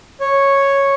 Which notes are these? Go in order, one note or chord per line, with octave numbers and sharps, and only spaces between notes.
C#5